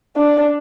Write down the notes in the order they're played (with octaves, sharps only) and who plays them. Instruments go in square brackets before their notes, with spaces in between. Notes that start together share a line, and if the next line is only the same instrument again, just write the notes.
[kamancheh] D4